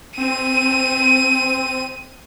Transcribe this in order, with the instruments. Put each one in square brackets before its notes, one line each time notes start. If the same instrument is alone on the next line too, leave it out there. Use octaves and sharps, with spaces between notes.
[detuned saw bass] C4 [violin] D#7